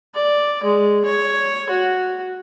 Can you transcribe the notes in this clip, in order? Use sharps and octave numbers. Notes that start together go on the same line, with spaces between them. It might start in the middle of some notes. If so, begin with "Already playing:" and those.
D5
G#3
C#5
F#4